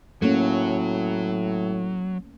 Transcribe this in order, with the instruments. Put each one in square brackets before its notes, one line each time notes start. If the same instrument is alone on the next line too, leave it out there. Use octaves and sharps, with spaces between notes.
[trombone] A2 [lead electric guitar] F#3 [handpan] A3 A#3 C#4